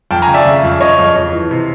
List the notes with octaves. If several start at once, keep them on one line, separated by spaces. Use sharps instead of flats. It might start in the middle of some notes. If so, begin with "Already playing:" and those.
F2 G5 A5
G#5 A#5
C#3
D5 E5
C#3
F2
C#3 C#5 D#5
F2
F2
E3
C3